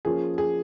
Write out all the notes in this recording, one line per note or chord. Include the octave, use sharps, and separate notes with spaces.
F3 A#3 C#4 F4 G#4
G#4